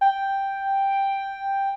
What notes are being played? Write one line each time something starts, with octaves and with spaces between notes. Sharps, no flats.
G5